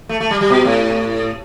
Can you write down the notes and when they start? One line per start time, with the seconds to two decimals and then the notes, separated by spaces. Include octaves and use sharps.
0.09 A3
0.20 A3
0.31 G3
0.41 G3
0.50 B2
0.65 A2